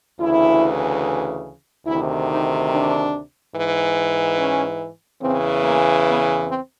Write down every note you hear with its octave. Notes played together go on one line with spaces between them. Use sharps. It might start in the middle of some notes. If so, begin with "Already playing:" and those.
D2 C#3 E3 E4
D2 C3 D#3 E4
D#4
D4
G#2 E3
C#4
E2 C#3 E3 C4
A#3
B3
C4